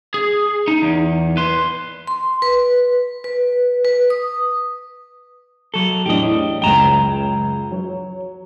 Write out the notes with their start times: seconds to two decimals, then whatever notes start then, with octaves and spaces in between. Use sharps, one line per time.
0.14 G#4
0.68 D#4
0.82 E2
1.37 B4 C6
2.07 C6
2.42 B4
3.24 B4
3.85 B4
4.10 D#6
5.74 F#3 A4
6.06 E2 A2 D4 G4 D#5
6.62 C#2 F#2 G5 A#5
7.71 F#3 C#5